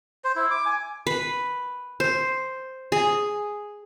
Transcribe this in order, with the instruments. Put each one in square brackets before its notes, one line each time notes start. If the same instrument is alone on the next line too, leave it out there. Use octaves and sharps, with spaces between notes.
[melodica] C5
E4
D6
G#5
[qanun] B4
C5
G#4